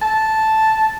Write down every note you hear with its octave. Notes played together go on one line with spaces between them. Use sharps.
A5